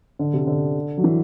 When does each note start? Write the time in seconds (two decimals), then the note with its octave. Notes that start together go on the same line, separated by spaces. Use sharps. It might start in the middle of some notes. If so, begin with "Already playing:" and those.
0.19 D3
0.33 C3
0.47 D3
0.97 F#3
1.04 E3